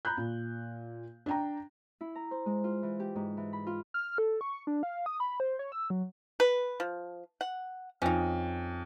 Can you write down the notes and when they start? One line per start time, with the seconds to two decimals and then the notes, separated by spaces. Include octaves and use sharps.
0.05 A#5 B5 F#6 G6
0.17 A#2
1.26 D4 G5 A#5
2.01 E4
2.15 A#5
2.31 C5
2.46 G#3
2.64 F4
2.83 E3
3.00 G4
3.15 G#2
3.37 E3
3.53 B5
3.67 F4
3.94 F6
4.18 A4
4.41 C#6
4.67 D4
4.83 F5
5.06 D#6
5.20 B5
5.40 C5
5.59 C#5
5.72 E6
5.90 F#3
6.40 B4
6.80 F3
7.41 F#5
8.02 F2 C#4 D#4